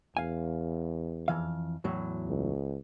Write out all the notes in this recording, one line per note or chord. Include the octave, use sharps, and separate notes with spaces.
E2 F5 G#5
F2 E3 F5
E2 A2 F#3
C#2